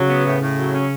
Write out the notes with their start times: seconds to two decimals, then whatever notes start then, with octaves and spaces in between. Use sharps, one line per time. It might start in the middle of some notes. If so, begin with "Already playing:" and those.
Already playing: C#3 F#3
0.09 B3
0.25 A2
0.41 A2
0.58 F#3
0.74 C#4